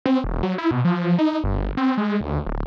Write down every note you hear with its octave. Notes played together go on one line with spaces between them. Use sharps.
C4
E1
F#3
E4
B2
F3
D#4
G1
C4
G#3
D2
D1